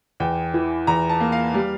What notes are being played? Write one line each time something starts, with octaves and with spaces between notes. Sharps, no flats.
E2 G5
E3
E2 A#5
A5
A#3
F5
G3